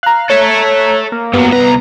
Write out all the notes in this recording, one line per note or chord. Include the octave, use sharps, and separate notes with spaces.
F5 A#5 F#6
A4 C#5 E5
A#3
G2 F#3 B3
C2 B4 A#5